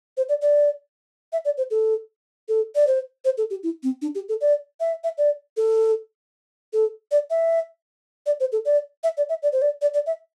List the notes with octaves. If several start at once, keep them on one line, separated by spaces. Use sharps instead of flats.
C5
D5
D5
E5
D5
C5
A4
A4
D5
C5
C5
A4
G4
E4
C4
D4
G4
A4
D5
E5
E5
D5
A4
A4
D5
E5
D5
C5
A4
D5
E5
D5
E5
D5
C5
D5
D5
D5
E5